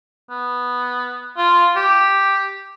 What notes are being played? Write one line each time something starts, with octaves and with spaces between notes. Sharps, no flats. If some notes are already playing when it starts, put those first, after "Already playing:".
B3
F4
G4